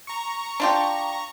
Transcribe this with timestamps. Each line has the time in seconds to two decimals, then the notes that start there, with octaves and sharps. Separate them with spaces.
0.07 A#5 C#6
0.60 D4 F4 G4